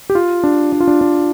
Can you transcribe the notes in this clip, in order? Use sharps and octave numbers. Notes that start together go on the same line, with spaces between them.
G4
F4
D4
D4
F4
D4
D4